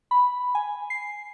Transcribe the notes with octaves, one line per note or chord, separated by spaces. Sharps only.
B5
G#5
C7